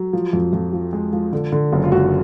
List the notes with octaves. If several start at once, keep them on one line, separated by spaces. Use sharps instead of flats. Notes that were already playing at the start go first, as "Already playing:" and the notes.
Already playing: F#3
F3
F2
F2
F3
G#3
F3
D3
D3
F#1
F4
F#2 F#4